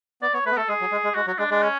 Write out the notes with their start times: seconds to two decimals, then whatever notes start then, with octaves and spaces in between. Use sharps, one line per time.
0.22 B3 D5
0.33 B3 C#5
0.46 A3 B4
0.51 B3
0.57 A3 A4
0.69 G#3 G#4
0.81 F#3
0.92 G#3
1.04 G#3
1.15 G#3 F#4
1.27 F#3 F#4
1.38 G#3 D4
1.50 G#3 D4
1.62 C#4